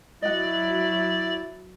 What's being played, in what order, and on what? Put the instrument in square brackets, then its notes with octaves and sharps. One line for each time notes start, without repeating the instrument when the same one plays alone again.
[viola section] F#3 [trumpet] E4 [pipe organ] D5 [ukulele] D#5 F#5